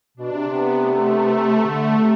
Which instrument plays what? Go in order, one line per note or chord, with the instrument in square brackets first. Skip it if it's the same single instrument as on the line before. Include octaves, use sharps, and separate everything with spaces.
[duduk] B2 [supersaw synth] D4
[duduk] C3
[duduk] C3 [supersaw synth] B3
[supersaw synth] A3
[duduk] D3 [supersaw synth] A3
[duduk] C3